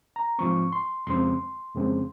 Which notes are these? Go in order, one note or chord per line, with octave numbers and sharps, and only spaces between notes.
A#5
G#2 F3 C4 C#6
C6
F2 C#3 G#3 C4 C6
F2 C#3 G#3 C4